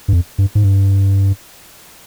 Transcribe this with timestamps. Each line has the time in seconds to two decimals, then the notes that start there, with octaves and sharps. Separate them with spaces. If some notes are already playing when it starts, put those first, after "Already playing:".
0.08 G2
0.13 F2
0.38 G2
0.55 G#2
0.64 G2